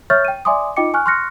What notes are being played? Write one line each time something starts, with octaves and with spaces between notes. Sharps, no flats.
C#5 E5 C#6 F6 G6 A6
G5 D#7
D5 E5 G#5 C6 D6 D#6
D#4 F4 D#5 G5 D6 C#7
G#5 C#6 F6 F#6
C6 C#6 F6 F#6 A#6 C#7